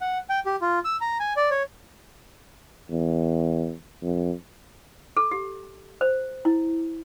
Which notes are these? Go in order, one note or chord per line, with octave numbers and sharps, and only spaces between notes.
F#5
G5
G4
F4
E6
A#5
G#5
D5
C#5
E2
F2
A4
G4
C5
E4